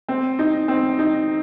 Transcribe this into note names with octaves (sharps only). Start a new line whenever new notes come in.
C4
D#4
C4
D#4